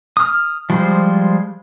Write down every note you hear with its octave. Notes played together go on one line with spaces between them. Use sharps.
D#6 F6
F3 G3 G#3 F4 C5